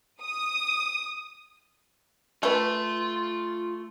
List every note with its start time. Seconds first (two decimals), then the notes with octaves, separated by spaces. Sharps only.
0.21 D#6
2.43 A3 F4 B4 C6